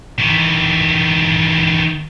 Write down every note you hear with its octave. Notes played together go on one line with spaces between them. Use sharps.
D#3 E3